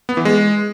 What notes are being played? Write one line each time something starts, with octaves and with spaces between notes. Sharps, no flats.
B3
E3
G#3